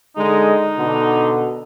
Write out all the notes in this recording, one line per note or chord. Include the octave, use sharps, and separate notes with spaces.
D3 G#3 D#4
B2 D3